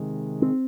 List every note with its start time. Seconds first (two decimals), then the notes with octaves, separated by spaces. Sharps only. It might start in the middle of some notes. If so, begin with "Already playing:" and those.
Already playing: C3 D#3 G#3
0.42 C4